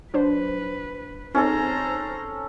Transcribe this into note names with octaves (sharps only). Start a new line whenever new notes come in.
F#3 D4 B4 C5
C4 C#4 D#4 G#4 A4 C5 A#5